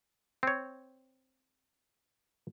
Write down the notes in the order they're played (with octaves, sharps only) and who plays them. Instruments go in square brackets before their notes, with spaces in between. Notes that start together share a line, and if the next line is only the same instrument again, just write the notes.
[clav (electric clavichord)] C4 C#5